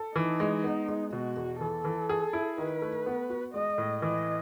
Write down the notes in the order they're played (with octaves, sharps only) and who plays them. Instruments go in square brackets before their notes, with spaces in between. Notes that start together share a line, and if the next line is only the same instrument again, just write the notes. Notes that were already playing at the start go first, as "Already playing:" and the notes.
Already playing: [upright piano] A4
[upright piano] E3 [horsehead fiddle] D#4
[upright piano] G#3
B3
G#3
[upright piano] B2 [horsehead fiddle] F#4
[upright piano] E2
[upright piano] E3 [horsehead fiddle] A4
[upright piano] E3
G#4
E4
[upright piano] D#3 [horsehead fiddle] B4
[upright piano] A3
B3
F#4
[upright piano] G#3 [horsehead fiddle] D#5
[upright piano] A2
[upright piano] E3 [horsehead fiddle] D#5